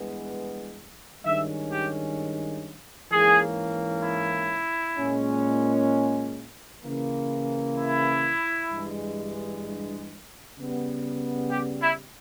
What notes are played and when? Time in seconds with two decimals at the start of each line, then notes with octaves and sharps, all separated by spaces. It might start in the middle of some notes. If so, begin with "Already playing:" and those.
Already playing: G2 E3 G#3 B3
1.24 G2 D#3 G#3 C#4 E5
1.71 G4
3.11 G#2 E3 A#3 C#4 G#4
4.04 E4
4.98 A#2 G#3 C#4
6.84 C#3 E3 A#3
7.78 E4
8.71 G2 E3 G#3
10.57 C#3 G3 B3
11.50 G4
11.81 E4